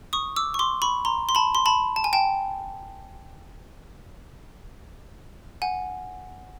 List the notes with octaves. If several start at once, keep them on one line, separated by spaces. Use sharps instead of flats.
C#6 D#6
D6 E6
C#6
C6 D6
B5 C#6
A#5 C6
C6
A5 B5
C6
A5 B5
A5
G#5
G5 A5
F#5 G#5